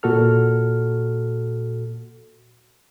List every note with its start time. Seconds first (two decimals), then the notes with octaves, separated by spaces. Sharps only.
0.03 A#2 F#4 A4 F6